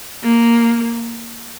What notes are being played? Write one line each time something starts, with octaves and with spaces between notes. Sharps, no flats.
A#3